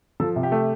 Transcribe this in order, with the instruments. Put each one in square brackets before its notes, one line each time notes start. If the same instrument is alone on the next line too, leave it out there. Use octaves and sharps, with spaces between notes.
[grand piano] F3 A4
C3
G4
A3